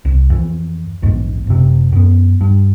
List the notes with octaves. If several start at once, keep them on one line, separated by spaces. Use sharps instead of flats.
C2
F2 E3
A#1 E2 G#2
F#1 C3
F#2 B3
G2